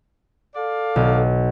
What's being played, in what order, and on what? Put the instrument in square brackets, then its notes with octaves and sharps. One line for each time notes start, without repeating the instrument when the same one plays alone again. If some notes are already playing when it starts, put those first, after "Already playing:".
[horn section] A4 D5 F5
[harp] B1